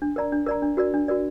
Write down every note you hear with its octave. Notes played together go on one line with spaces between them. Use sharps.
D4
A#4 D5 A#5
D4
A#4 D5 A#5
D4
F#4 A#4 D5
D4
F#4 A#4 D5